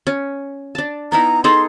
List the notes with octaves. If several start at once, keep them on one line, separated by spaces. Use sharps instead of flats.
C#4
D4 A5
B3 D#4 E4 A#5
D#4 G#4 A4 C6